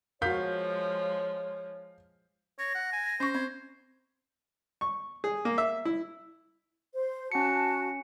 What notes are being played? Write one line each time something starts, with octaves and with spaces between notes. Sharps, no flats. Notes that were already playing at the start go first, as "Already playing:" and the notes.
F3 G#3 F#4 A#4 C#5 F5 G6 B6
C#5 A#6
F#5
G#5
C#4 C5 C#6
C4 G#6
C#6
G#4
A#3
E5
E4
C5
C#4 F#4 A5 C#7